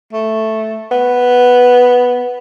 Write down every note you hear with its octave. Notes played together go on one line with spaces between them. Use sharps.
A3
B3